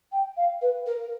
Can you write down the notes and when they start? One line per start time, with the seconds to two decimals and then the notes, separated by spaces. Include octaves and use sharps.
0.12 G5
0.37 F5
0.61 B4
0.86 A#4